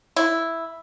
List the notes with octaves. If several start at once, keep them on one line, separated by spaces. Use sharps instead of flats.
E4